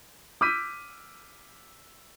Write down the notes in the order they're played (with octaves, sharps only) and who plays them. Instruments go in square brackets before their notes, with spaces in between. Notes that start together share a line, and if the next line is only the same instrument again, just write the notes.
[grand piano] D6 E6 F6 G6 B6 D#7